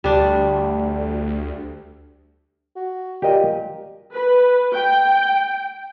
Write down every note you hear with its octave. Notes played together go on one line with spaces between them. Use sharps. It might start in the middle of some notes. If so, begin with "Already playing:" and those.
D2 G3 D4
F#4
A#2 G4 D#5
B4
G5